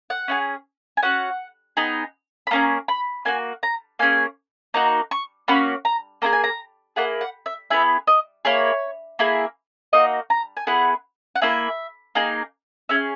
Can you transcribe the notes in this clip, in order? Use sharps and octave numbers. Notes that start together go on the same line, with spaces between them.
F#5
C#4 E4 G#4
G#5
C#4 F#4 F#5
B3 D#4 G#4
B5
A#3 C#4 G#4 A#5
B5
A#3 D#4 F#4 G#5
A#5
A#3 C#4 G#4 G#5
A#3 D#4 F#4 A#5
C#6
A#3 C#4 F#4 B5
A#5
A#3 E4 G#4 A#5
G#5
A#5
A#3 E4 G#4 F#5
F#5
E5
B3 E4 G#4 E5
D#5
A#3 E4 G#4 C#5
A#3 E4 G#4
A#3 D#4 F#4 D#5
A#5
G#5
B3 E4 G#4 F#5
F#5
A#3 E4 G#4 E5
A#3 D#4 G#4
C#4 G#4 E5